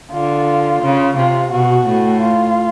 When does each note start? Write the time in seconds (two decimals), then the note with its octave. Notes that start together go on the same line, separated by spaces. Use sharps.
0.12 D3 F4
0.82 C#3
1.17 C3 F4
1.51 B2 F#4
1.87 A2
2.21 F4